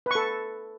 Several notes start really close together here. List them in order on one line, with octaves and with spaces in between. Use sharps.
B4 C#6 A4